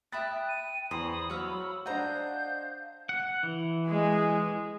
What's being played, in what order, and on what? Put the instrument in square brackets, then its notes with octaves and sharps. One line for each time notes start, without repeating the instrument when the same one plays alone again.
[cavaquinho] E5 B5 D#6 [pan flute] G5 [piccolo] F#6 [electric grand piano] A6 B6
[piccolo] D#7
[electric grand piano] E2 [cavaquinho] C5 [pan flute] B5 [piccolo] D#6
[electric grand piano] F#3 [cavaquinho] C#5 F5 [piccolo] E6
[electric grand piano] D4 C5 F#5 [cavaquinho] D#5 A#5 [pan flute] F5 [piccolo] G6
[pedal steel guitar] F#5
E3
[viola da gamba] G#3 G#4